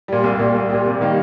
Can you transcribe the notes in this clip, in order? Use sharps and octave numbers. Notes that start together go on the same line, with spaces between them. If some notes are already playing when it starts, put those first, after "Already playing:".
A#2 G3
C2
A#2 G3
C2
A#2 G3
C3
D#3 G3 A#3